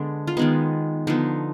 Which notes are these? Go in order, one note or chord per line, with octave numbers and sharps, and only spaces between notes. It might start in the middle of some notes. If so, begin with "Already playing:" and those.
Already playing: D3 G#3 B3 D4
F4
D#3 G#3 B3 D#4
D3 F3 B3 D#4